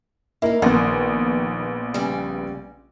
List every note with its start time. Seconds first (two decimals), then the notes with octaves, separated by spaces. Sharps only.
0.42 A#3 D#4 E4 A#4
0.62 A#1 D#3 B3
1.94 C#3 G3